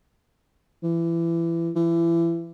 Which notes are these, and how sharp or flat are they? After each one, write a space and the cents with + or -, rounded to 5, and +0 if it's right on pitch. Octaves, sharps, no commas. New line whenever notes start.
E3 +25
E3 +30